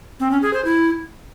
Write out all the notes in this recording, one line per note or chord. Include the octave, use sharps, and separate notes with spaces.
C4
C#4
G#4
C5
E4